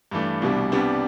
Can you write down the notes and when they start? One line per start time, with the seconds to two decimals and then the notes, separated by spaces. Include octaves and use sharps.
0.11 G2 E3 A3 D4
0.42 C2 B2 G3 D4
0.72 C2 C3 G3 B3 D4